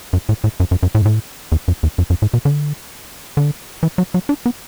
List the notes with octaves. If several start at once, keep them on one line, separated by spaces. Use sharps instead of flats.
F#2
A2
A2
F#2
F#2
F#2
A2
F#2
A2
E2
F#2
E2
F#2
F#2
A2
B2
D3
D3
E3
F#3
F#3
D4
B3